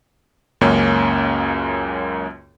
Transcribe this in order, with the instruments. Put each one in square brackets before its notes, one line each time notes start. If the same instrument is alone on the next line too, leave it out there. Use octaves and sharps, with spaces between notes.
[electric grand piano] C#2 F#2 A#3 C#4